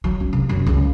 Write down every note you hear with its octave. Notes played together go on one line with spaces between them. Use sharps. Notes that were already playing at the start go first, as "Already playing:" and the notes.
F#3
C#4
C3
F#2
C#2